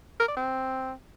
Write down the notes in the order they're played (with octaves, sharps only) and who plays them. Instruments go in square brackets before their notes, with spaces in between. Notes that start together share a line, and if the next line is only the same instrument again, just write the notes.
[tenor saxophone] A#4
D5
C4